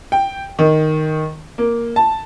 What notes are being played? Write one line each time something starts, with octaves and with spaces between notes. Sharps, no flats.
G5
D#3
A#3
A5